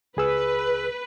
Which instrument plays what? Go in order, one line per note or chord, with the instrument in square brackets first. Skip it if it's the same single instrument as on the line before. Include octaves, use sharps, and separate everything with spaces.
[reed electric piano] C#2 G#4 E6 [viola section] B4